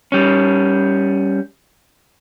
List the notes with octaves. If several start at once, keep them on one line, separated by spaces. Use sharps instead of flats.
G3 C#4